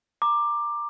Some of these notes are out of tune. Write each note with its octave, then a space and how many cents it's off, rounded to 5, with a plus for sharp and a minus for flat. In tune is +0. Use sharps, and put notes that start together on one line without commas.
A#5 +5 D6 +15